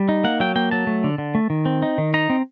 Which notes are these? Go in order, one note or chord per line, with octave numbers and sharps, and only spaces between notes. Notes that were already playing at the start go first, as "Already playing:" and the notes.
Already playing: G3
D#4
A#3 F#5
F#3 G5
A#3 G5
F#3 A5
A3
D3
D3
A3
D#3
C4
D#4
D#3
D#4 A#5
C4